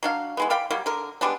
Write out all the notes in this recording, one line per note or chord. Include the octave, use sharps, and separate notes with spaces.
F#3 D4 F5
E3 G#3 B3
D5 F5 G5 B5
F#3 G3 A#3
D3 A#4
G3 G#3 B3 D4